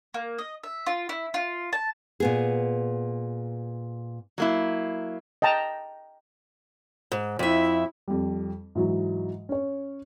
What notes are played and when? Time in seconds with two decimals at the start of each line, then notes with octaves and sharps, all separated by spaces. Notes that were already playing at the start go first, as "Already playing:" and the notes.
0.14 A#3
0.39 D#5
0.64 E5
0.87 F4
1.09 E4
1.34 F4
1.73 A5
2.20 A#2 B3 G#4
4.38 F#3 A#3 E4
5.42 D#5 G5 A5 A#5
7.12 G#2
7.39 F2 E4 E5
8.08 F2 G3
8.75 G#2 E3 F#3
9.49 C#4 C#5